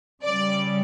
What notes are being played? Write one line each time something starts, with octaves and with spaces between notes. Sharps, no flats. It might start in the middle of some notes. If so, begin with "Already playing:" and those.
C#3 G3 D5